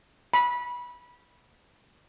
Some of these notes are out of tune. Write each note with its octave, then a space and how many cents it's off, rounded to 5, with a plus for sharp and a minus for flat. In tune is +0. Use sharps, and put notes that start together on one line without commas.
B5 -20